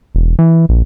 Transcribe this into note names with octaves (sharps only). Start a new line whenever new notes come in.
E1
E3
A#1